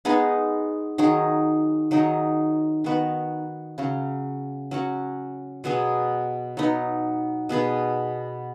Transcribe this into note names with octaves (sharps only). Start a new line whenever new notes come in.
G#3 B3 D#4 G#4
D#3 F#3 D#4 G#4
D#3 F#3 D#4 G#4
D#3 B3 F#4 B4
C#3 F#3 C#4
F#3 C#4 F#4
B2 F#3 B3 G#4
F#3 B3 D#4
B2 B3 G#4 B4